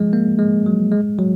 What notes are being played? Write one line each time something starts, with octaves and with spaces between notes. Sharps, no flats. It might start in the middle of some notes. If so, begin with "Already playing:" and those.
Already playing: F3 G#3
A#3
G#3
F#3
G#3
F#3